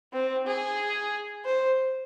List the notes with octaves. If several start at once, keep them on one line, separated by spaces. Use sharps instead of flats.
C4
G#4
C5